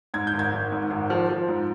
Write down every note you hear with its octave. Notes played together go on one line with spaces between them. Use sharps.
G#2 G#6
G6
G#1
G#6
G#1
G#2
G#1
F3
F3
G#2